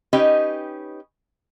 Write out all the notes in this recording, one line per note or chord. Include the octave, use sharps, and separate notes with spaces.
C#4 D#4 G4 B4 D#5